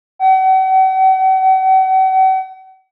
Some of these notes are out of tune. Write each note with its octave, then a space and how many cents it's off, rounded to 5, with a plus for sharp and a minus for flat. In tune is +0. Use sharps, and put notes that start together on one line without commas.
F#5 +45